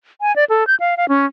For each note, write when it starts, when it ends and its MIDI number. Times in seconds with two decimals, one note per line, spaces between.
0.21 0.35 80
0.36 0.44 74
0.50 0.66 69
0.67 0.75 91
0.80 0.95 77
0.97 1.08 77
1.09 1.26 61